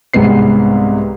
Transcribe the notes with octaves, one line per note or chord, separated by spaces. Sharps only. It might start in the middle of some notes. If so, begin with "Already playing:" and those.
C2 G#2 C3 B3 C7